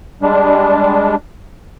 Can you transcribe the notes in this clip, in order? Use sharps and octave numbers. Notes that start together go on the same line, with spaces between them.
G3 G#3 D4